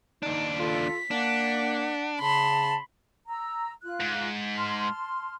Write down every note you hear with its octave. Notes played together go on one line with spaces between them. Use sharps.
D#2 D4 D#4
F4 A4 B6
A#3 D4 F#5
C#3 A5 B5 C6
A#5 E6
F4 F#6
G#2
A5 C6 F6